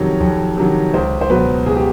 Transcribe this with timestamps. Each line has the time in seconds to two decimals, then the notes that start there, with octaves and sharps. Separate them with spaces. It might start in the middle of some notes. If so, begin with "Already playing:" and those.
Already playing: F2 C3 D#3 F#3 C#5
0.20 F2
0.57 C3 D#3 F#3
0.94 C#2 C5
1.21 C5
1.30 B2 F#3 B4
1.66 C#2 G#4
1.76 G4